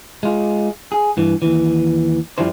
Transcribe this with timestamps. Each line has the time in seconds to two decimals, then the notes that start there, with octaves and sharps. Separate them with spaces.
0.23 G#3 F4
0.92 G#4
1.17 G2 E3
1.42 D#2 E3
2.38 F#2 A#2 F3 G3 E4 C5